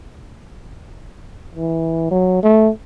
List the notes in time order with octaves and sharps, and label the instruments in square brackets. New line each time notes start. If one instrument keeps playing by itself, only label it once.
[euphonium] E3
F#3
A3